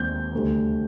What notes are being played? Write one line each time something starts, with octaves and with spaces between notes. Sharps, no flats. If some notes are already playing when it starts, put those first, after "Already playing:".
Already playing: D#2 D#3 G#3 C4 G6
D2 C3 G3 C4